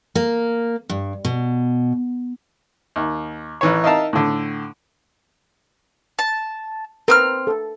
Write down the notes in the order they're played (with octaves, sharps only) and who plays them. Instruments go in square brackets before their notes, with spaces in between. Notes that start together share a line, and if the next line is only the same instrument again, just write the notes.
[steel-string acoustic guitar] A#3
G2
B2
[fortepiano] D#2
A1 E3 C#5
D#4 A#4 E5 F5 A5 A#5
A2 D3
[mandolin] A5
[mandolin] C4 D#6 F6 [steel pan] A#4 B4
[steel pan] A4